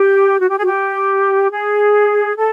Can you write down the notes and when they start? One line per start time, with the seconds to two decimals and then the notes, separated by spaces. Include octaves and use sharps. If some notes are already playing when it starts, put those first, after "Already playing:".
Already playing: G4
0.38 F#4
0.48 G4
0.57 F#4 G#4
0.66 G4
1.51 G#4
2.35 A4